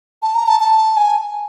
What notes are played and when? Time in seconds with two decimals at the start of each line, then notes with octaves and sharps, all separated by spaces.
0.22 A5
0.34 A#5
0.47 A5
0.60 A5
0.97 G#5